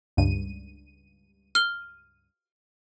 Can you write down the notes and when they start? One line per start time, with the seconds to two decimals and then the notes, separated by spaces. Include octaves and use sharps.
0.17 C#2 G2 D#7
1.55 F6 G7